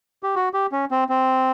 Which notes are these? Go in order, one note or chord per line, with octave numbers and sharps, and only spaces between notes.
G4
F#4
G4
C#4
C4
C4